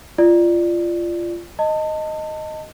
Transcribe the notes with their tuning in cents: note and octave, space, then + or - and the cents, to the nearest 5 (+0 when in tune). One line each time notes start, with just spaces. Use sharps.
F4 -20 D5 +15
D#5 +0 A5 +30